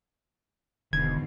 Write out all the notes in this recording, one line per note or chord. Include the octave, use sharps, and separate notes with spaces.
E1 E2 G#2 B2 D3 D#3 G#6